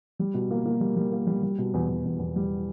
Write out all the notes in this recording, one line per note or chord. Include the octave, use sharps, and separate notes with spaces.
G3
B2
A#3
A#3
G3
G3
A#3
G3
G3
B2
E2
E2
E2
E2
G3